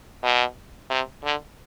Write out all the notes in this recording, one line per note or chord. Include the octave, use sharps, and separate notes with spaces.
B2
C3
D3